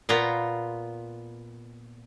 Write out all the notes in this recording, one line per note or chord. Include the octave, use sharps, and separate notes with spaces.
A#2 B3 F4 A#5